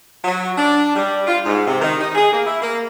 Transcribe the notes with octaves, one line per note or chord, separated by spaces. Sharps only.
F#3
D4
G3
F4
G#2
C3
D#3
D#4
G#4
A#3
E4
A#3